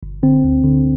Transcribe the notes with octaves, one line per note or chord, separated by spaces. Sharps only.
G1
D3 C4
D2
D3